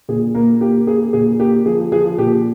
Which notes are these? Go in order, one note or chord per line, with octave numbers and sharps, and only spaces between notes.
A#2 G#4
A#2 A#3 A#4
A#3 G4
A#3 G#4
A#2 G#4
A#3 G4
F3 G#4
F3 G#4
A#2 G4